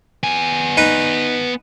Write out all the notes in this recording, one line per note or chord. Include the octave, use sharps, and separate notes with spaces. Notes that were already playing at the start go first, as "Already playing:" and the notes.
B3 G#5
D#4 B4